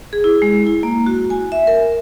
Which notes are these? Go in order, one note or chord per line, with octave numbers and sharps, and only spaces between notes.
G#4
E4
G#3
E4
A#3
F#4
G#5
E5
A#4